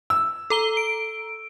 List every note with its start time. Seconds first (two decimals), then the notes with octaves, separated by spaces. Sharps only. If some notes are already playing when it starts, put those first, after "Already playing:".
0.10 E6
0.50 A4 A#5 G7
0.77 D7